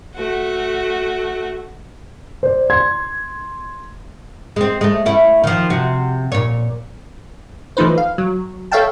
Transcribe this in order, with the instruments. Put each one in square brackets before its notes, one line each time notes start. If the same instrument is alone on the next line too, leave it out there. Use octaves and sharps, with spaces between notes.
[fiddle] A3 F#4
[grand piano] C5 D5
C6 G#6
[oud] G#3 C4
G#3 A3
A3 C#4 E4
D#3 F3
C3 F#4
A#2 C#5
[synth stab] E3 F3 A3 D#4 B4 C5
F5
F#3
A4 C#5 E5 F5 G5 A5